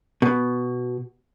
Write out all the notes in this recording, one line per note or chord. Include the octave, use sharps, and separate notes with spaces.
B2